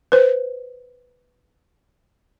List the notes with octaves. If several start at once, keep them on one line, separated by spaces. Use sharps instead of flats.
B4 C5